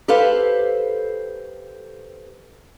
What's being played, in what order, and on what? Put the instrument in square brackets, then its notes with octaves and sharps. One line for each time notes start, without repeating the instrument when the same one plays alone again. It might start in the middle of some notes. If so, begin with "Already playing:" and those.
[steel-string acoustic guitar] G4 A4 B4 C5 F5